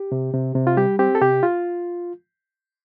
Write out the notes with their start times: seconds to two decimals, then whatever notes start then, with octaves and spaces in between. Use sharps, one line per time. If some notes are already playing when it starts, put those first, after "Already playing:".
Already playing: G4
0.12 C3
0.34 C3
0.55 C3
0.67 F4
0.77 G3 G4
0.99 C4 G4
1.15 A4
1.21 C3 G4
1.43 F4